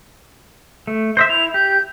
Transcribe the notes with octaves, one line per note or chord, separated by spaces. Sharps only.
A3
C5 D#5 E5 C6
E4 F7
G4 G6